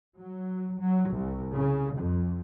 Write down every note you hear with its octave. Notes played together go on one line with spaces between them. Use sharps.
F#3
F#3
C2
C#3
F2